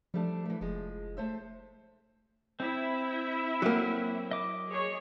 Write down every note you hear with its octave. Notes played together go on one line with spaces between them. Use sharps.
F3 G3 A3 D4
E3 A3
F1 F3 G#3
A3 C5 E5
C4 E4 E5
F#3 A#3
D#5 D6
G#4 C#5